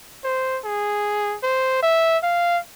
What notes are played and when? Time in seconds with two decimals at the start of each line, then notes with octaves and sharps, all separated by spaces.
0.24 C5
0.65 G#4
1.43 C5
1.83 E5
2.23 F5